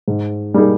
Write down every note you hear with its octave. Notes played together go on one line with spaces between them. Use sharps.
G#2
G3 A#3 D#4 G#4